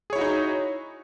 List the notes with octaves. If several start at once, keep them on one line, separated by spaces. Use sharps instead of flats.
D#4 E4 F#4 G#4 C#5